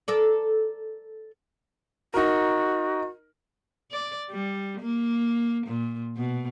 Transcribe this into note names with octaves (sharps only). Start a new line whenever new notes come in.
A4 A#4 D5
D#4 F#4 A#4
D5
G3
A#3
A#2
B2